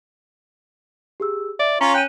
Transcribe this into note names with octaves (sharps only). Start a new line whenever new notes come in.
G4 G#4 E6
D5 E5
C#4 F4 C#5 A#5
G5 F#6 D#7